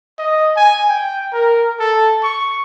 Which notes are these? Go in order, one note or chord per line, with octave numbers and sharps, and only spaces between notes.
D#5
G#5
G5
A#4
A4
C#6